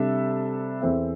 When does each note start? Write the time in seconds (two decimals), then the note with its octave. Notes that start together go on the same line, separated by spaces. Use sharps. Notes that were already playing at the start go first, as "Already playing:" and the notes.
Already playing: C3 G3 D4 A4 E5
0.81 E2 E3 C4 A4 E5